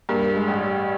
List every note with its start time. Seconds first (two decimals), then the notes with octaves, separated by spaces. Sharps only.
0.09 G2 A#3
0.36 G#3
0.48 A1
0.61 G3